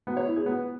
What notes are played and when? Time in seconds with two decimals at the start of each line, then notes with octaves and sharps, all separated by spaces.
0.07 B3
0.17 C#5
0.27 E4
0.36 G#4
0.46 B3